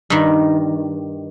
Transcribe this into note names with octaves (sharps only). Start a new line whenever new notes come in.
G2 D#3